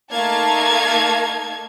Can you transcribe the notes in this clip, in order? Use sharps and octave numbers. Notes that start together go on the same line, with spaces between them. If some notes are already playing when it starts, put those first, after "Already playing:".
A3 A#3 D#4 F5 A5 G#6